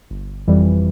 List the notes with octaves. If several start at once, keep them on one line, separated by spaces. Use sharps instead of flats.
G1
F2 E3 G3